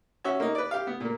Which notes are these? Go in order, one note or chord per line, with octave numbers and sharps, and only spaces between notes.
C#4 F#4 E5
A#3 D#4
B4 D5
G4 F5
B3
A#2 A#3